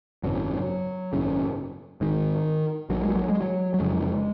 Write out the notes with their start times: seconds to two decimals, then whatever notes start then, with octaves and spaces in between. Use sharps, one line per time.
0.23 G#1 F#2 C#3 F#3
1.13 G#1 F#2 C#3
2.01 G#1 G#2 D#3
2.90 A#1 A#2 F#3
3.03 G#3
3.16 F#3
3.29 G#3
3.42 F#3
3.74 F#3
3.79 F1 F2 C#3 G#3